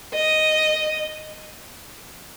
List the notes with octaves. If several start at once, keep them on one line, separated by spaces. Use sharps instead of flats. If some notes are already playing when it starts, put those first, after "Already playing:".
D#5